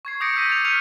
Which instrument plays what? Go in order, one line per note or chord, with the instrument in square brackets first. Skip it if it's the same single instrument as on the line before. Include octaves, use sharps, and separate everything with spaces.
[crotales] C#6 G#6 C7
D6 D#6 G6 A#6 C#7 D7
E6 G6 B6 D#7
A6 F7
F6 G6 B6 C#7 D#7 F7